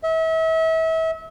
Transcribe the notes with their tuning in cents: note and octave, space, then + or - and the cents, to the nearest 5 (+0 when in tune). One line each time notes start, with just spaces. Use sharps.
E5 -35